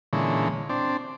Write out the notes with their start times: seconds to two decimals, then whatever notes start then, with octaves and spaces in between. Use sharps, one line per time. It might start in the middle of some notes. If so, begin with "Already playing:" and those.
0.13 A#2 D3 E3 G#3 C#4
0.69 C4 D4